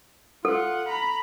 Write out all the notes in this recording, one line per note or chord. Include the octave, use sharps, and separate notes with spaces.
F4 A4 F#5
A#5 B5